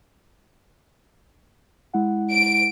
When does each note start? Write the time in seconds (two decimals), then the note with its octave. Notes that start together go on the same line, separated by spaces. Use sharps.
1.93 G#3 E4 F#5
2.31 D7